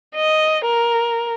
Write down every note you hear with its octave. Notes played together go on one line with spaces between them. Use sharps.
D#5
A#4